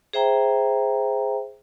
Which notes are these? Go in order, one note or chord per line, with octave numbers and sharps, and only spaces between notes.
G#4 C5 E5 G5 A#5